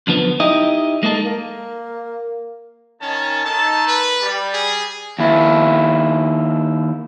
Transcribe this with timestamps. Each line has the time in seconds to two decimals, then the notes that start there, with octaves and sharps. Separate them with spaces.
0.07 F#2 D3 F3 B3
0.40 D#4 E4 G4 D#5
1.03 G#3 A#3 D#4 A4
1.25 A#3
3.02 D#3 C#4 A5
3.45 D#3 D#4 A4 A5
3.88 B4
4.22 G3
4.53 G#4
5.19 D#2 E4